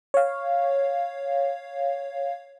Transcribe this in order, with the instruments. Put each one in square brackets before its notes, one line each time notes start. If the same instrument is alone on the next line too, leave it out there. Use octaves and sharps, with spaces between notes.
[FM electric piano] C#5 F5